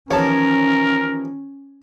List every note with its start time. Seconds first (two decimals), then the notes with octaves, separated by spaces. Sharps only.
0.11 D#2 E3 F3 C#4 A#4 C#5 A5